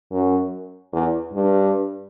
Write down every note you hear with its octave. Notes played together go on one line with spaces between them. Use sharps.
F#2
E2
G2